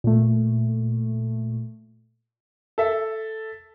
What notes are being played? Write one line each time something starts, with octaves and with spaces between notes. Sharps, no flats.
A#2 A3
A4 E5